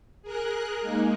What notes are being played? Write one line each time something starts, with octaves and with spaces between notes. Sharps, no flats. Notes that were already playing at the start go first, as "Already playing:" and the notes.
G#4 A#4 F#6
G#3 A#3 D#4